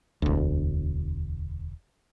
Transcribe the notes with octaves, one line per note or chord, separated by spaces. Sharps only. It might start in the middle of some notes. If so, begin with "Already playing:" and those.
E1 D2